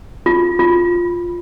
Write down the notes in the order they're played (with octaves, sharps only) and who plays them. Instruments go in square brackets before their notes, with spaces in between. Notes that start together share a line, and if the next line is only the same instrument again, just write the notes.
[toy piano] F4
F4